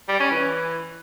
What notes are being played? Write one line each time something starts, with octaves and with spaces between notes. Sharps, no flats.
G3
C#4
E3